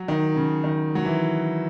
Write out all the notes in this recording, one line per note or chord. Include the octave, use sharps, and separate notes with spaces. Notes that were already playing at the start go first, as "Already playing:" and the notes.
Already playing: F#3
D#3
C#3
D#3
F#3
E3